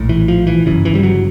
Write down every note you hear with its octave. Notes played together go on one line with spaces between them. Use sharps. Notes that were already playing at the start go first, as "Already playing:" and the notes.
Already playing: A#1 A2
E3
F3
E3
G1 F#2 C#3 E3
E3
G3
F#3